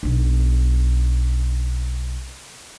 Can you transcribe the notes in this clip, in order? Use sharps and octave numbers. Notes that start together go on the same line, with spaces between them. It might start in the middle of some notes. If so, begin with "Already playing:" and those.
B1 D4